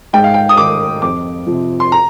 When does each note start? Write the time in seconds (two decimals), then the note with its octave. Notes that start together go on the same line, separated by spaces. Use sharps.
0.13 G#2 G5
0.24 F5
0.34 G5
0.49 D#6
0.57 D#3 D6
1.02 F2 D6
1.47 C3 F3
1.80 C6
1.92 A#5